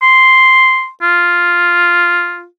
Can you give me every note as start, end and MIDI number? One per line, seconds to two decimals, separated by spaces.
0.02 0.89 84
1.02 2.46 65